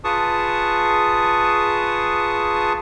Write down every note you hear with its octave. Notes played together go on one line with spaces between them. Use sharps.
F4 G#4 B4 A5 C#6 D#6